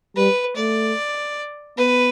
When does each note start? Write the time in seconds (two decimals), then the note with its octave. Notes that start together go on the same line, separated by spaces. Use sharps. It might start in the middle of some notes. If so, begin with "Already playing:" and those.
0.16 G3 B4
0.56 A3 D5
1.78 B3 B4